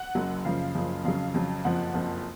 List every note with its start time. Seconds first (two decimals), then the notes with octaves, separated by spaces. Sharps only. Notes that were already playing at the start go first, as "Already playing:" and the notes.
Already playing: F#5
0.15 F#1 F#2 C#3 F#3
0.45 F#1 F#2 C#3 F3 F5
0.75 F#1 F#2 C#3 F3
1.04 F2 C#3 F#3 F5
1.34 F2 C#3 F#3
1.64 F#1 F2 F3 F#5
1.94 F#1 F2 F3